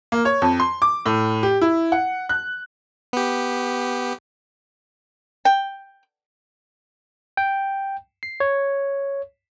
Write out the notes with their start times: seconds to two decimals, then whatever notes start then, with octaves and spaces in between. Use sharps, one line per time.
0.12 A#3
0.25 C#5
0.42 F2
0.60 C6
0.82 D6
1.06 A2
1.43 G4
1.61 E4
1.92 F#5
2.29 F#6
3.13 B3 G4
5.45 G5
7.37 G5
8.23 C7
8.40 C#5